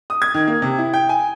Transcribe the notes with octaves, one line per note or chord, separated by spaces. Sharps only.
D#6
G#6
D#3
A#3
C3
E4
G5
G#5